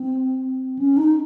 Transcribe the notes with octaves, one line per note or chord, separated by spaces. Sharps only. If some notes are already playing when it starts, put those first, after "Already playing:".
Already playing: C4
C#4
D#4